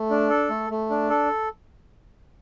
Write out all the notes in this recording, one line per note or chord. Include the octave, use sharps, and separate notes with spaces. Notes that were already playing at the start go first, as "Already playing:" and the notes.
Already playing: A3
D4
A4
A3
A3
D4
A4